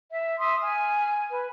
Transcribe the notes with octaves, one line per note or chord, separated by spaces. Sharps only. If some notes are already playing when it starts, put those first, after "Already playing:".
E5
E5 C6 D#6 E6
G#5 F6
B4